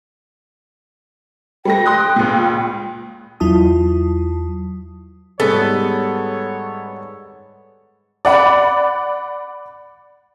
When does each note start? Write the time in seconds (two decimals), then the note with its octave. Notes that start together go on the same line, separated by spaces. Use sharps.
1.65 G3 A3 G5 A#6
1.86 C6 D#6 F#6
2.16 C#2 A#2
3.40 E2 F#3 E4 F4 A5 D#6
5.40 G#2 G3 G#3 B3 A4 C#5
8.25 D5 F#5 B5